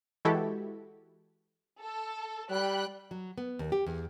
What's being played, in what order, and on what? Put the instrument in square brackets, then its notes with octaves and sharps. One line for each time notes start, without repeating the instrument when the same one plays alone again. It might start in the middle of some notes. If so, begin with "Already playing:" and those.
[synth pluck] E3 G#3 E4 F#4 G4 A4
[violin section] A4
[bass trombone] G3 [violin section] G5 B5 F#6
[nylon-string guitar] F#3
B3
D#2
G4
E2